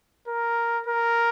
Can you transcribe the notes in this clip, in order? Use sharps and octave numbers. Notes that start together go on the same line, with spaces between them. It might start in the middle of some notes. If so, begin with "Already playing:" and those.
A#4
A#4